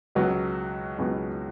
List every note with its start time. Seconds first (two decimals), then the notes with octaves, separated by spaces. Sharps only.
0.15 C#2 B2 F#3 B3 F#4
0.98 C#2 B2 F#3 B3 F#4